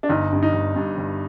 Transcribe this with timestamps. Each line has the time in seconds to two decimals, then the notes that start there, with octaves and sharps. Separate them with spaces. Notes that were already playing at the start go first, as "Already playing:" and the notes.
0.03 D4
0.09 G1 D#4
0.33 G2
0.43 D#4
0.53 G1
0.76 G2
0.97 G1